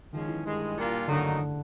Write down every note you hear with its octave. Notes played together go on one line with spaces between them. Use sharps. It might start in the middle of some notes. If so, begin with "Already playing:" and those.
D#3 F3 G#3 C#4
E3
G2 D#3 G#3
A#2 G3 A#3 D4 F4
D3 D#3 F#3 A#3 D#4